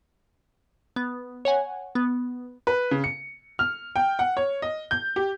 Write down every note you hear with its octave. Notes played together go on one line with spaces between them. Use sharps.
B3
C#5 F#5 G#5
B3
B4
C#3
C#7
F6
G5
F#5
C#5
D#5
G6
G4